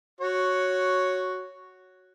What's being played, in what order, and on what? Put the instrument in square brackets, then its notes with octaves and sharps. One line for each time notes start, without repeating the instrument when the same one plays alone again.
[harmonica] F#4 C#5